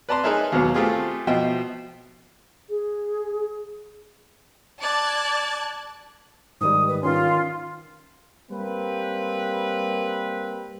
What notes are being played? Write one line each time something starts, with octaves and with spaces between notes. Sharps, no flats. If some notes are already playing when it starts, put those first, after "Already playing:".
B4 D5 A5 A#5 C6
D#4 G#4 A#4 B4 C#5 E5
D#2 B2 F#3 B3
A3 C4 F4 G4 G#4
B2 F3 D#5 E5 G5
G#4
D5 A5 F#6 G#6
G#2 D#3 G3 D#6
B4
D#3 C#4 F4 C6
G3 A#3 C4 B4